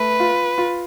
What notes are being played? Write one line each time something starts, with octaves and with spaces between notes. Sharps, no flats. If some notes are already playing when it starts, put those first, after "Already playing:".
Already playing: A3 B4
F4
F4